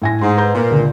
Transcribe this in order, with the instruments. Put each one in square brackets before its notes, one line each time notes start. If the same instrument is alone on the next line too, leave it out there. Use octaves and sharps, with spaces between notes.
[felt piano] A2 G#5 A#6
[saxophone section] G#2 [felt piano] C6
[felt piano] B4 A#5 G6
[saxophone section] A#2
[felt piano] C#2 D3